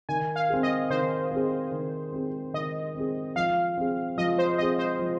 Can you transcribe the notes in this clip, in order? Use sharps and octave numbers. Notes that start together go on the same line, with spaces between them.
D#3 G#5
F5
C4 G#4
D#5
D#3 C5
C4 G#4
D#3
C4 G#4
D#3 D#5
C4 G#4
F3 F5
C4 G#4
F3 D#5
C5
C4 G#4 D#5
C5
F3